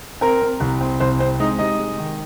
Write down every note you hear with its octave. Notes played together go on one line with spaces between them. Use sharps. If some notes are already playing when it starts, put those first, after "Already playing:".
C4 A#4
C4
C2
C4
C2 C5
C4 C5
G#3 D#4 D#5
C3 D#4 D#5
G#3
D#3